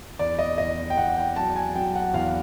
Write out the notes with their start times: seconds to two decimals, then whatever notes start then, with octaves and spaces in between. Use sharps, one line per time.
0.19 E2 D5
0.39 D#5
0.58 E2 D#5
0.90 G5
0.97 E2 F#5
1.17 G5
1.36 F#3 A5
1.56 G#5
1.75 F#3 G5
1.95 F#5
2.14 E2 F5